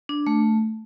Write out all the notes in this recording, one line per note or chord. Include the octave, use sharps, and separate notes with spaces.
D4
A3